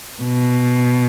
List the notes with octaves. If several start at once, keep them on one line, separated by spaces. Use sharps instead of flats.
B2